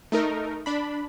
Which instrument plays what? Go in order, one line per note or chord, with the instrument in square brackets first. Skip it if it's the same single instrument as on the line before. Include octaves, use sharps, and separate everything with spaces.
[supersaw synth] A3 D#4 A#4
D4 B5